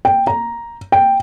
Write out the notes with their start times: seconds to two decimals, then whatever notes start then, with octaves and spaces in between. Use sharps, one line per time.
0.05 G5
0.27 A#5
0.92 G5